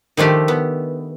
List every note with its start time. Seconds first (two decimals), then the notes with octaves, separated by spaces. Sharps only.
0.17 D#3 F3 A3 D4 G4
0.48 B3